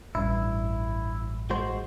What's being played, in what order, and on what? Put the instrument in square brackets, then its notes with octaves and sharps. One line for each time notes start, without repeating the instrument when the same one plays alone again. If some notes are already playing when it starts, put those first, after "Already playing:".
[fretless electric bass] A1 G2 [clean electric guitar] E4
[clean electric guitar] G#3 F#4 C5